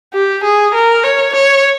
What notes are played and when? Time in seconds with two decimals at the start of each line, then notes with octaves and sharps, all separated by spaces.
0.13 G4
0.43 G#4
0.74 A#4
1.04 C#5
1.34 C#5